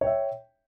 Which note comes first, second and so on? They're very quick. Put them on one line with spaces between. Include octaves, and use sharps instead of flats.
C#5 G5 E5